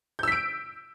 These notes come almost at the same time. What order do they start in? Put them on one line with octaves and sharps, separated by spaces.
G6 E6 B6 D7